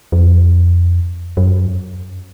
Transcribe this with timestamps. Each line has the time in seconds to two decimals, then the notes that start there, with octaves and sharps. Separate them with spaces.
0.12 F2
1.37 F#2